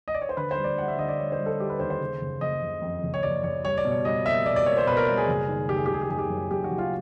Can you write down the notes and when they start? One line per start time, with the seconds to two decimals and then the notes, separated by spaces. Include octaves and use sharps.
0.08 D#5
0.14 D5
0.21 C#5
0.29 C5
0.37 D3 B4
0.51 C5
0.57 G3
0.64 D5
0.78 G3 F#5
0.88 E5
0.98 D3 D#5
1.09 D5
1.19 G3 C#5
1.32 C5
1.40 G3
1.46 A4
1.59 G3 G4
1.70 B4
1.80 D#2 C5
1.90 C5
2.00 C#3
2.21 F#1
2.41 F#1 D#5
2.62 F#1
2.82 F2
3.03 F#1
3.14 C#5
3.23 F#1 D5
3.43 F#1 C#5
3.64 G3 C#5
3.78 D5
3.85 B2
3.91 C#5
4.05 G3 D#5
4.25 A#3 E5
4.46 B2 D5
4.56 D5
4.66 A#3 C#5
4.77 C5
4.87 B2 B4
4.97 A#4
5.08 G3
5.17 G#4
5.28 F#1
5.48 D#3
5.69 F#1 G4
5.77 G#4
5.86 G4
5.89 F#1 G#4
6.02 G4
6.10 F#1 G#4
6.18 G4
6.30 F#2
6.51 F#2 G4
6.64 F#4
6.70 F#1
6.78 F4